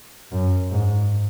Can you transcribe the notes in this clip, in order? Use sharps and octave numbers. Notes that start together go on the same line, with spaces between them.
F#2
G#2